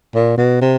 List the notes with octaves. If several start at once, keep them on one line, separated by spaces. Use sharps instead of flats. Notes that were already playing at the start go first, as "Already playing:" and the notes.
A#2
B2
C3